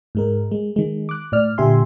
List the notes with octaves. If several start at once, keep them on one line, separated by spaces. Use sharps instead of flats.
G#2 G#3 A#4
G#3
D#3 G#3
D6 F#6
A2 D5 F6
A#2 D3 G4 E5 G#5 C6